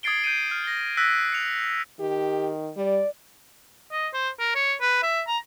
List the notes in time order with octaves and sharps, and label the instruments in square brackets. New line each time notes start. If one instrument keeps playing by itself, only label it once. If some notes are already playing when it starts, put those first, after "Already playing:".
[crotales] D#6 G#6 A6 C7 D7 G7
G6 D7 D#7
F6
A#6 G7
E6 F#6 A#6 B6
C#7 F7
[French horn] D#3 [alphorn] G4
[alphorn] G3 [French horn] D5
[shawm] D#5
C5
A#4
C#5
B4
E5
A#5